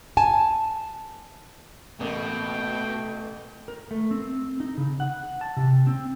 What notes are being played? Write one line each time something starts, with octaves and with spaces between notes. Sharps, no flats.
G#5 A5
A1 B2 A3 A#3 G5
A#4
A3
C4
D#4
C#3
F#5
A5
C3
C4